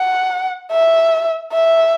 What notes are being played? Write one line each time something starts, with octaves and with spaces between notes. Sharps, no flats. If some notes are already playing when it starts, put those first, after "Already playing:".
Already playing: F#5
E5
E5